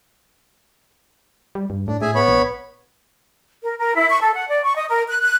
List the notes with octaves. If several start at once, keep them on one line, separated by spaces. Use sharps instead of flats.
G3
G2
A2 D4
A2 G#4 E5 G#5
B3 C#5 B5
A#1
A#4
A#4
E4
C#6
A4
F#5
D5
C#6
D#5
A#4
F#6
F#6